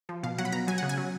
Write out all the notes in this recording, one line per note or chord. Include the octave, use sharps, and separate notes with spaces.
F3
B2 F5
F#3 F#5
B5
B2 A#5
F#3 G#5
C#3 F#5
G#5
F#3